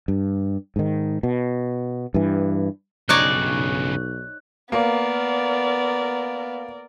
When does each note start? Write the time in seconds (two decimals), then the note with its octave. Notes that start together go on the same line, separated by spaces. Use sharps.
0.08 G2
0.76 G#2 D#3
1.23 B2
2.14 G2 E3
3.09 B1 G2 C#3 D#4 C#5 D5 F#6
4.72 A#3 B3 A#4 D5